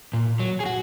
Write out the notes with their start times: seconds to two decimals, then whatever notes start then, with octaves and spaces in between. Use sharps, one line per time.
0.13 A#2
0.40 F#3
0.60 G#4
0.66 F#4